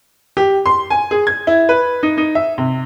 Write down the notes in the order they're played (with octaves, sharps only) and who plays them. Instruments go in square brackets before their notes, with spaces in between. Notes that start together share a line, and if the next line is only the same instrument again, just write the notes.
[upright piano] G4
C6
G#5
G#4
G#6
E4
B4
D#4
D#4
E5
C3